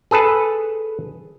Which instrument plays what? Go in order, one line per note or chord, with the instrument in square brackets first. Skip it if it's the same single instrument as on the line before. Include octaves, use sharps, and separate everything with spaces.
[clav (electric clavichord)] G#4 A4 B4 A5